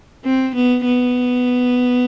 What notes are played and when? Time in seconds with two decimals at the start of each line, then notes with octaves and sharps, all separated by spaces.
0.25 C4
0.55 B3
0.85 B3